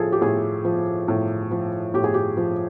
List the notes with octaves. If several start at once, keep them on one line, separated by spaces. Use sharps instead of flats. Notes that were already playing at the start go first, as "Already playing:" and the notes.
Already playing: A2 F3 F4 G#4 A4
G4
A2 G#4
F3
A2
F3
A2 G4
G#4
G4
F3